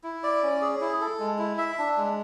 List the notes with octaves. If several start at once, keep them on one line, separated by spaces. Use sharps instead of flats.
E4
D5
C#4
G#4
E4
A4
G#3
E4
E5
D4
G#3